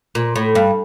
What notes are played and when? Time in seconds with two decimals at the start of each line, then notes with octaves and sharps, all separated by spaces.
0.15 A#2
0.36 A2
0.55 G2